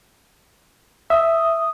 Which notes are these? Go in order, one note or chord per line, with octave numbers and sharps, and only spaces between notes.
E5 D#6